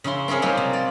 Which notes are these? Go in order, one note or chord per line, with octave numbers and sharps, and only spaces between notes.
C#3 C#4 E4 C6
C4 C#4 E4 G#4 A#4
F#3 G3 A#3 D#4 F4 G4
C3
D5